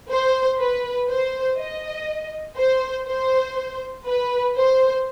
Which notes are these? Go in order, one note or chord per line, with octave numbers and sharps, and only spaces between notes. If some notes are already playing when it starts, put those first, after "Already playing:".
C5
B4
C5
D#5
C5
C5
B4
C5